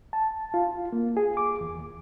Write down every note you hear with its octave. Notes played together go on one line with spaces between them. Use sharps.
A5
F4
A#3
G#4
D6
E2
D#2